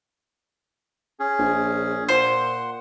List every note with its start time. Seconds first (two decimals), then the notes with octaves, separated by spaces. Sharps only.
1.20 C#4 G#4
1.39 A#1
2.09 A#2 C5 F#5 C6